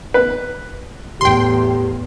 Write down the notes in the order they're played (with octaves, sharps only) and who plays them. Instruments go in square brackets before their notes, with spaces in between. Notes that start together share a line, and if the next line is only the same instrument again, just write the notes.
[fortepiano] B4
[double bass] E2 A2 [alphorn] G4 [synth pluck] G5 C6